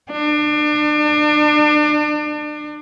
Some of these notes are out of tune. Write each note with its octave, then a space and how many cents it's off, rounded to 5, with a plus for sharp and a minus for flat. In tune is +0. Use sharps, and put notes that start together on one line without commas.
D4 +35